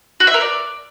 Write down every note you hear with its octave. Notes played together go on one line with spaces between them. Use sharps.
F#4
E5
A#4
D5